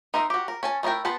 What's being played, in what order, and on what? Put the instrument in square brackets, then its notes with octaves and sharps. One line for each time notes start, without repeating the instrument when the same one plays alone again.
[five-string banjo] D#4 A#4 C5 D#5 E5
F#4 G4
A#4
C#4 G#5 A5
A3 D#4 E4 A#4 G5
B3 C5 A5 B5